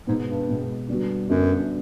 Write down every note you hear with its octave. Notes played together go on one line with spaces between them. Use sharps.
G#2 B2 G#3 B3
G2
B2 G#3 B3
D3 G3 B3 D4 F#4
F#2 D3 G3 B3 D4 F#4